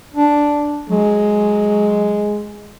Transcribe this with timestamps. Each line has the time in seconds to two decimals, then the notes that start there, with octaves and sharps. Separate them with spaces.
0.14 D4
0.90 F#3 G#3